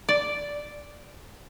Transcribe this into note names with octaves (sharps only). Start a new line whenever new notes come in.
D5